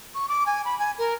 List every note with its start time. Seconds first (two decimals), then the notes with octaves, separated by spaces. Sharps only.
0.15 C#6
0.28 D6
0.46 G#5
0.65 B5
0.79 G#5
0.98 A#4